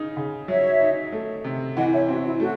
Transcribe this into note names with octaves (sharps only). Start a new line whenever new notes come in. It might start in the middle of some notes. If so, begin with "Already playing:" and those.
Already playing: C#3 D#4
C#3
F#3 C#5 E5
D#4
A3
C3
E3 D#5 F#5
C#5 E5
C4 F#4
E4
A3 F#4